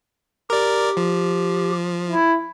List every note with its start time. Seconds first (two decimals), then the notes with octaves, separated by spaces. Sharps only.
0.50 G4 A#4 D5
0.97 F3
2.08 E4